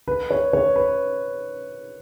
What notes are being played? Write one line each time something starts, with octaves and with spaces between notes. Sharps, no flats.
B4
C#5
C#5
B4